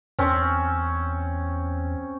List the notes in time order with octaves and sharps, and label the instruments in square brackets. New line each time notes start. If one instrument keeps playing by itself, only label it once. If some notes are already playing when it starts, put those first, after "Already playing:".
[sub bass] E2 [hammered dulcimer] C4 C#4